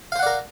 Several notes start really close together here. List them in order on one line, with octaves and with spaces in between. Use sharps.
F5 C5 F#5 D5 A#4